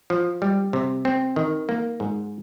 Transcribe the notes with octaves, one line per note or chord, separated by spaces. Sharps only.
F3
G3
C3
C4
D#3
A#3
G#2